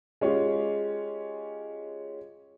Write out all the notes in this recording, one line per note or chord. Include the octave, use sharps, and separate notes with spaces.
G#3 C#4 F4 G4